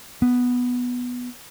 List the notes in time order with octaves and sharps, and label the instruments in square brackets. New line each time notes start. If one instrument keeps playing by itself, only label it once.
[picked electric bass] B3